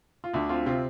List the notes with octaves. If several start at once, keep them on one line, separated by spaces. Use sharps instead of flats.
F4
D2 D3 D4
C4 F4
C3 C4 F4